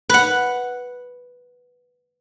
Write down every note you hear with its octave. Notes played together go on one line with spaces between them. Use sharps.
B4 F#5